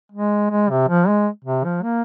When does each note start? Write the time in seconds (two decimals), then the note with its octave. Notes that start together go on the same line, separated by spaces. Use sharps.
0.12 G#3
0.50 G#3
0.70 C3
0.88 F3
1.08 G#3
1.44 C3
1.65 F3
1.83 A#3